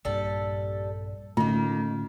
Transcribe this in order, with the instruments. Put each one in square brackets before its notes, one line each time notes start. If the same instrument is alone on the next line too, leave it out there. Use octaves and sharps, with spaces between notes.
[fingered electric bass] A#1 G2 [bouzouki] G3 A4
[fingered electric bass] A2 D3 C#4 [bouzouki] D#3 A#3 [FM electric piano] A3 [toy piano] F4